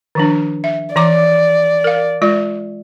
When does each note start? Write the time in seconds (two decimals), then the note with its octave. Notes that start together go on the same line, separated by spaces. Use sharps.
0.15 D#3 F3 D4
0.64 E5
0.96 E3 D5 A#5 D6
1.84 A#4 F5
2.22 G#3 F4 D5